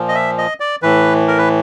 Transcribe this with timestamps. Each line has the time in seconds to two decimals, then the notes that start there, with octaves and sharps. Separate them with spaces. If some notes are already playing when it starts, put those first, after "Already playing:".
Already playing: A#2 F3
0.09 D#5
0.15 E5
0.38 D#5
0.60 D5
0.82 A2 E3 B4
1.27 A#4
1.38 B4